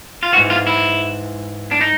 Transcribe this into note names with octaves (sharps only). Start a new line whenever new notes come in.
F4
G#2 E3 F#4
F4
E4
D4
D#4